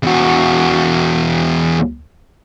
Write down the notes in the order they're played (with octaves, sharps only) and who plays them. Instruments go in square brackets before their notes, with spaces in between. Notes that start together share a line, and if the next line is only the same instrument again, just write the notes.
[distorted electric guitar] E2 F#4